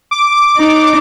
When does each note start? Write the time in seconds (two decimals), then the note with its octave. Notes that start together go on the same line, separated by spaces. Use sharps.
0.11 D6
0.58 D#4